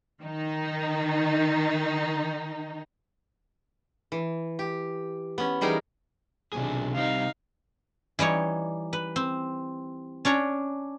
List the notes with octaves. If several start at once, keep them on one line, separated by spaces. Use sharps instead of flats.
D#3 D#4
E3
G4
B3 C#4
E3 G3 D#4 G#4 A#4
B1 C3 D#3 D4 G#4
C3 G3 D#4 F5
E3 G3 D#4 C#5
B4
C4
C#4 D4 C#5 A#5